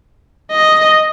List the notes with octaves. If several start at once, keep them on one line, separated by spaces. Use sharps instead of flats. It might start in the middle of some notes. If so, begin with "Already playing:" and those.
D#5